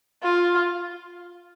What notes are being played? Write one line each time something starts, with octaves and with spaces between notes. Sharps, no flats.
F4